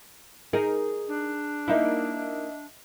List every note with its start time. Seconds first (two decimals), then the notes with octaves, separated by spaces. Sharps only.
0.53 D#4 G#4 A#4
1.08 D4
1.68 A#3 D#4 E4 D#5 E5